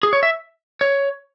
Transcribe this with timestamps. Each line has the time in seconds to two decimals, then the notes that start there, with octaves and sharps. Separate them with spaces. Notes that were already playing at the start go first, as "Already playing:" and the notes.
0.03 G#4
0.13 C#5
0.23 E5
0.81 C#5